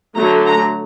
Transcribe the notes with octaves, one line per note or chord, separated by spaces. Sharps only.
D3 F#3 A3 A#5
A#5